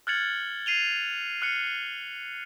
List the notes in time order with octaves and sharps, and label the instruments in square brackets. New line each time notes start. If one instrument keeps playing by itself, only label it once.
[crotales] F6 F#6 G#6 A6 C#7 F#7
C7 D#7 F7 G7
F6 F#6 C#7